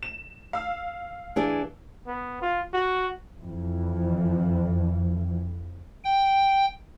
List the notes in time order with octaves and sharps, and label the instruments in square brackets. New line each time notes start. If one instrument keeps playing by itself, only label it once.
[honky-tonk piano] E7
F5 E6
[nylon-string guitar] E3 D4 G#4
[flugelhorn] B3
F4
F#4
[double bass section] F2 E3 F3
[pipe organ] G5